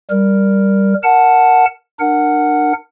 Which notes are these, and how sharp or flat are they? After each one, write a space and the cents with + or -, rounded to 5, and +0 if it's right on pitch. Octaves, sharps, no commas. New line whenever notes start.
G3 +0 A#4 +0
A#4 +0 F#5 +0 A5 +0
D4 +30 A#4 +0 F#5 +0